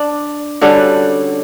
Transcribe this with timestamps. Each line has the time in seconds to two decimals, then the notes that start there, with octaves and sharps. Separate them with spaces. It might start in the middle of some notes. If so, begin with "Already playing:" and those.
Already playing: D4
0.61 D3 G3 C#4 D4 F#4